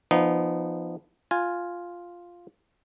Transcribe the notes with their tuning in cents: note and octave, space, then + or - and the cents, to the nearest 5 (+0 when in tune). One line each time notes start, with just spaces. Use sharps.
F3 -20 B3 +0 D#4 -25
F4 +0 G#5 +0